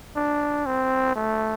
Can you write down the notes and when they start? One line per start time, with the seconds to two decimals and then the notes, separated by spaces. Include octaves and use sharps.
0.16 D4
0.66 C4
1.16 A3